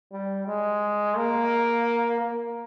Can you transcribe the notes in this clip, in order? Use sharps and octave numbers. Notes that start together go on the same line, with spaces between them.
G3
G#3
A#3
A#3